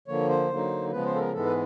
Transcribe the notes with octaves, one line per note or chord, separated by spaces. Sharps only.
D3 F3 A#3 C#5
C5
D3 F#3 A#3 D#4
C#3 F3 G#3 B3 B4
C5
A4
A#4
G#2 E3 G#3 B3 A4
B4